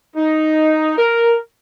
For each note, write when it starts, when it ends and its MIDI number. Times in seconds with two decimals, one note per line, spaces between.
0.15 0.94 63
0.97 1.36 70